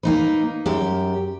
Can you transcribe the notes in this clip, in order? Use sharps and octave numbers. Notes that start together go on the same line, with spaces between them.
A#3 D#4 B4
F#2 G4